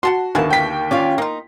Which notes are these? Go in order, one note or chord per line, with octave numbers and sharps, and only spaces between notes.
F#4 F#5 A5 C6
D#2 D3 A#3 B3 E4 G#4 G#5 A5
G5 B6
C#4 F4 D5 F5
A#3 D#4 F4